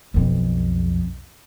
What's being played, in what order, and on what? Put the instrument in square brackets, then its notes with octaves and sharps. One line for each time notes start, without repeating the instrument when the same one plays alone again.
[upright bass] B1 F2